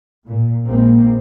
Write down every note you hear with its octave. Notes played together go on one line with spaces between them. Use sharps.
A#2
A#1 G#3 A#3 C4